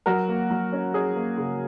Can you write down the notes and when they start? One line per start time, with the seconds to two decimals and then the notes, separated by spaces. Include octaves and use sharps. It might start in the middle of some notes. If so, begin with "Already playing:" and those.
0.06 F#3 F#4 A#4
0.28 A#3
0.50 F#3
0.72 C#4
0.94 C#4 G#4
1.16 A#3
1.37 C#3